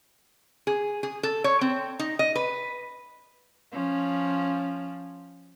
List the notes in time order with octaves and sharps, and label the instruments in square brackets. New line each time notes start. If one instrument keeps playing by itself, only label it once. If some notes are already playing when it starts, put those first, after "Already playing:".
[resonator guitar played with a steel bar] G#4
G#4
A4
C#5
C4
D#4
D#5
B4
[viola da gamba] F3 C#4